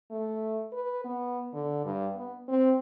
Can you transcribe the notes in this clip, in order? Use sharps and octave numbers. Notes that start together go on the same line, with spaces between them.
A3
B4
B3
D3
G2
B3
C4